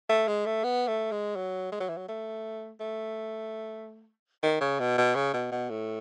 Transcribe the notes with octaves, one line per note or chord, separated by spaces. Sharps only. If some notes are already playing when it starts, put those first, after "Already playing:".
A3
G#3
A3
B3
A3
G#3
F#3
G#3
F#3
E3
F#3
A3
A3
D#3
C#3
B2
B2
C#3
B2
B2
A2